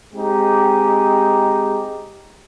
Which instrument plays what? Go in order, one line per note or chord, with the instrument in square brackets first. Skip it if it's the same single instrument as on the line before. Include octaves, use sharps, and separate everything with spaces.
[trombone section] G#3 C4 D#4 G4